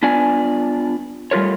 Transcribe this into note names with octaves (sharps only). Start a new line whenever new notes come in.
B3 D4 F4 D5 G#5
G3 A3 F4 A#4 C#5